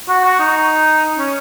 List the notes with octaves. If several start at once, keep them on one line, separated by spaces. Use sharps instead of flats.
F#4
F#4
D#4
C#4